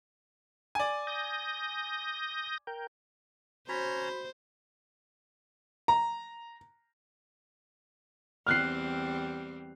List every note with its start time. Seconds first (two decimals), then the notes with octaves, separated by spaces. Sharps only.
0.75 D5 G#5
1.07 D#6 G6 A#6
2.67 A#4 G5
3.69 C#4 F#4 C5 C#5 A#5 B5 B6
5.88 A#5
8.47 E2 G3 C4 F6 F#6 C7